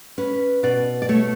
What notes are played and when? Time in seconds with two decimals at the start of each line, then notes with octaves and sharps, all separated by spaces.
0.18 C#4 B4
0.63 B2 D5
1.02 D5
1.09 A3 C#5